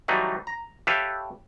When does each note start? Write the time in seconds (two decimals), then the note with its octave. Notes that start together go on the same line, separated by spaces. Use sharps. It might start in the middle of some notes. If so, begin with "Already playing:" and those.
0.08 E3 F#3 G3 A3 D#4
0.47 A#5
0.87 G4 A4 B4 C#5 E5 F5